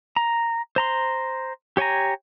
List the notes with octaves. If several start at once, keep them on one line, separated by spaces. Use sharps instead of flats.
A#5
C5 A#5 C6
G4 C#5 G5 G#5 A#5